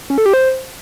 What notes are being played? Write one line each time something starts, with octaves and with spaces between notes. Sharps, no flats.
C#4
A4
G4
C5